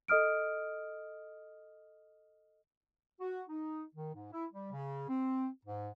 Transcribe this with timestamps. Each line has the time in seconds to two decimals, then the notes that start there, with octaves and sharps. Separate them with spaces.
0.08 A4 D#5 D#6 F6 D7
3.21 F#4
3.49 D#4
3.95 D#3
4.15 G#2
4.32 E4
4.52 G3
4.72 C#3
5.09 C4
5.65 G#2